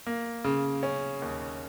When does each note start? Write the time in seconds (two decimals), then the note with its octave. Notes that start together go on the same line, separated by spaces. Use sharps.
0.07 A#3
0.44 C#3
0.83 C#4
1.22 D#2